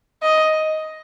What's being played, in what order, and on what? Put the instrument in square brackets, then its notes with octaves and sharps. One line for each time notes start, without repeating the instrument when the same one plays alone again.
[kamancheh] D#5